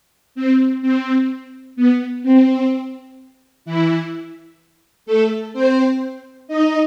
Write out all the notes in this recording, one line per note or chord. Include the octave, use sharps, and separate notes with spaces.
C4
C4
B3
C4
E3 E4
A3 A4
C4 C5
D#4 D#5